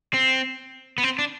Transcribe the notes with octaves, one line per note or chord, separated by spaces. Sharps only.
C4
B3
C4
D4